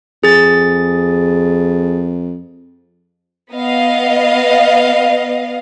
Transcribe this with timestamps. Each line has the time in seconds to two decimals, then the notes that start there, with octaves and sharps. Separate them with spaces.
0.24 F2 G#4 A6
3.52 B3 D#5 F5